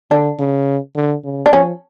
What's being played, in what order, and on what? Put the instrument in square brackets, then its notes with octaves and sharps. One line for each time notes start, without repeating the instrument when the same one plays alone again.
[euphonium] D3 [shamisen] D4
[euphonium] C#3
D3
C#3
[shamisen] D4
[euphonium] F3 [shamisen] C#4